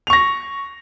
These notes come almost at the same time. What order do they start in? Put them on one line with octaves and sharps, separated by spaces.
F7 C#6 A#6